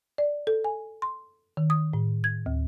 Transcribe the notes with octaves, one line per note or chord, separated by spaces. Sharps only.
D5
A4
G#5
C6
D#3
D#6
A2
G#6
D2